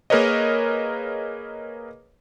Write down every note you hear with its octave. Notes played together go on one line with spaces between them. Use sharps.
A#3 G#4 A#4 B4 C#5 D#5